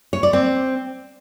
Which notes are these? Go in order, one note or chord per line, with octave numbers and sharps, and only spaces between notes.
C#5
D5
C4